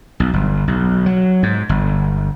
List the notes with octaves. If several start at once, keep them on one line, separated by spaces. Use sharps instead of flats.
B1
G1
B1
F#3
G#2
G1